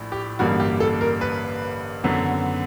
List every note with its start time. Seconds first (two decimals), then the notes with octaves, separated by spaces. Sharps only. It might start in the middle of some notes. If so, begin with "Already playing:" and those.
Already playing: A#1 A2
0.12 G4
0.39 A1 G2 D3 G3 A#3 F#4
0.60 G4
0.80 A4
1.01 A#4
1.21 B4
2.04 G#1 F#2 D3 F#3 B3